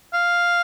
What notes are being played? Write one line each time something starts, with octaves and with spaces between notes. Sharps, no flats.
F5